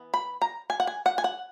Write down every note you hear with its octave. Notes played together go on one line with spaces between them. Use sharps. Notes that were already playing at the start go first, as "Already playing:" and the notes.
Already playing: E3 B3
B5
A#5
G#5
F#5
G#5
F#5
G#5
F#5